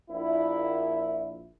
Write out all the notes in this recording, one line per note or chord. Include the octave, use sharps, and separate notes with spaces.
A#1 E4